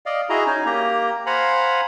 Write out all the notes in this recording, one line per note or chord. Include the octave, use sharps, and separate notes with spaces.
D5 D#5 F5
E4 F#4 G#4 D#5 A#5
C#4 D#4 G#5
A#3 G4 A#5
C5 F5 F#5 G#5 A#5 B5